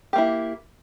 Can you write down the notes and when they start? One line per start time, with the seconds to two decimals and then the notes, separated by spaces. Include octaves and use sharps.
0.13 G4
0.16 A#3
0.18 E4